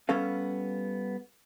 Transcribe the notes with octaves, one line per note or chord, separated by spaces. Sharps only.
G3 B3 C#4 A4 F5